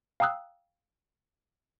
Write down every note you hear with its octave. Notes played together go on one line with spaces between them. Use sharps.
F5 G5 A#5 D#6 E6 F#6